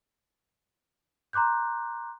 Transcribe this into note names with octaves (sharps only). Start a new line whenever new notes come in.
A#5 C6 D6 F#6 G6